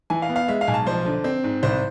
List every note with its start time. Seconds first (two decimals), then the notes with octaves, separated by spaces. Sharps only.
0.10 E3 G#5
0.22 F5
0.29 B3
0.36 F5
0.48 G#3 E5
0.61 F5
0.67 B1 G#5
0.74 A5
0.86 F3 C5
1.05 D3
1.24 C4
1.44 G#2
1.63 C2 C5